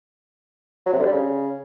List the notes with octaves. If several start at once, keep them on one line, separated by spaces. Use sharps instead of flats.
F#3
C3
D3
G3
C#3